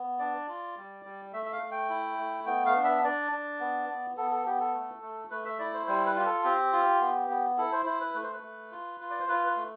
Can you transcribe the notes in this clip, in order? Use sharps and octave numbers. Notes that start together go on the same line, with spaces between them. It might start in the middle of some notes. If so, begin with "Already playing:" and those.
Already playing: B3
D4 D5
F4
G3
G3
A3 E5
E5
F5
A3
G5
E4
A3
B3 G5
F5
D4
E5
D4 D5
D4
B3
B3
B3 A4
A4
B3 G4
A4
A3
A3
A3 B4
E5
E4 D5
C5
G3 C5
B4
F4 G4
A4
C4 G4
F4
B3
B3
E4 A4
C5
E4 C5
B4
A3 B4
C5
B4
A3
F4
F4
D5
C5
F4 B4
B4
A3